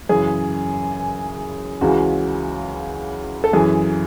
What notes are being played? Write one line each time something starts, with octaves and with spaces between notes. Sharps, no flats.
F#2 C#3 E3 G#4
C#2 C#3 E3 F#4
A4
F#2 E3 G#4